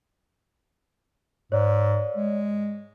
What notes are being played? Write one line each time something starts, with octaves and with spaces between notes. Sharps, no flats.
G#2 C#5 D5
G#3